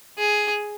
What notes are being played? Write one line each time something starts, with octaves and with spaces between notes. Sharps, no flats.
G#4